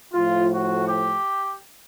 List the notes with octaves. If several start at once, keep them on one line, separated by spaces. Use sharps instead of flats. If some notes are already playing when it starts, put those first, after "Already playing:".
A2 F3 A3 F4
F#4
G4